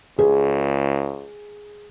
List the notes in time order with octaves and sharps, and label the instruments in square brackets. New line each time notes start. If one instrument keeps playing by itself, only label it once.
[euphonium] C#2 [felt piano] G#4